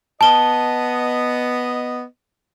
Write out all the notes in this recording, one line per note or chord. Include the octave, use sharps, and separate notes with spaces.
B3 D#5 A5 G7